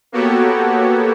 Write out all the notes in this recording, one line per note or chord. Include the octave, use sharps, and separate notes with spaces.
A#3 B3 F#4 G4 A4 C#5